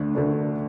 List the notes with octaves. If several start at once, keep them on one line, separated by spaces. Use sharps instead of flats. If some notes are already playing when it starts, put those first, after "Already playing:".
Already playing: D2 D3 A3 D4
D2 D3 A3 D4